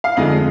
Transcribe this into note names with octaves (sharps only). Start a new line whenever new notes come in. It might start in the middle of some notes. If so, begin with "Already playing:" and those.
F5
F2 D3 G#3 D4 D#4 D#5